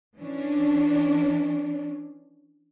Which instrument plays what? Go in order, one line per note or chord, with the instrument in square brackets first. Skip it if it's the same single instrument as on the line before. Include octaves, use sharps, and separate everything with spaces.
[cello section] E3 C#4 D4